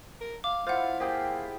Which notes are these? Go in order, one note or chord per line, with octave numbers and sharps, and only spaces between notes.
A#4
F5 D6
E4 F4 C5 F5 F#5
A#3 G4 G#4 C5 G5